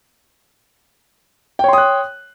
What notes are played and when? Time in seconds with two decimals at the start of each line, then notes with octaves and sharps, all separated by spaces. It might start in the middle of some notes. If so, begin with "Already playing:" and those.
1.59 G5
1.64 C#5
1.69 C6
1.73 D#6
1.78 F#6